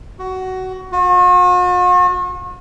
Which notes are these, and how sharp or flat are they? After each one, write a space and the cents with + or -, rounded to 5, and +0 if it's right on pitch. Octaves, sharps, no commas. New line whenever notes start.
F#4 +15
F#4 -45